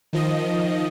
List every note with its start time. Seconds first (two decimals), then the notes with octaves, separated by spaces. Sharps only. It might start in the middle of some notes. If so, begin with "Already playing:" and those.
0.13 D#3 F3 D#5